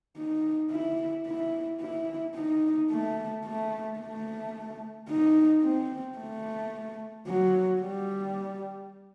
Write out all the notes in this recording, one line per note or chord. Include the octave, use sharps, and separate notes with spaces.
D#4
E4
E4
E4
D#4
A3
A3
A3
D#4
C4
A3
F#3
G3